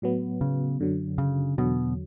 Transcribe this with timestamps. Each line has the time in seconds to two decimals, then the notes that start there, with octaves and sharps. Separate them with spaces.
0.02 A2 F#3 B3
0.41 C#3
0.80 F#2 D3 F#3
1.18 C#3
1.58 E2 B2 D3 F#3